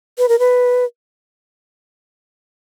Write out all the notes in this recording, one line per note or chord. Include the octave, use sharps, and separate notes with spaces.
B4
A#4
B4